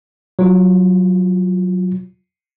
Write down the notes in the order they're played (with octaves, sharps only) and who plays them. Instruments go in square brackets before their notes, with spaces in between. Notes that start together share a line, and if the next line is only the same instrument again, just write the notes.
[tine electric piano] F#3 F4